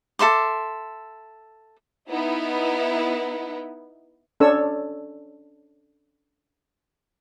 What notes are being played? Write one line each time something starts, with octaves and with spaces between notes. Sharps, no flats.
A4 E5 C6 D6
B3 D#4 E4
C#4 D4 A4 C#5 E6